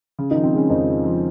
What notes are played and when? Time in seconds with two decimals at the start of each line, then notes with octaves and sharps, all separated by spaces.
0.19 C#3
0.31 D#3 F3 D#4
0.44 C4
0.53 G#3 C#4
0.70 F2 D#3 D#4
0.87 C#3
1.04 F3